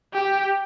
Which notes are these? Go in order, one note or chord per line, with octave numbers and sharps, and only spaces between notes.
G4